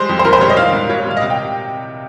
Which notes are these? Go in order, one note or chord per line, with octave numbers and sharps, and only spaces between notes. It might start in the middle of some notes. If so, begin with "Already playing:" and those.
Already playing: G3 G#3 C5
F2
C5
A#2 A#4
C5
G3 C#5
D#5
D#3 F5
G#2
A#2 C#5
G3 F5
D#5
C3 F5
G5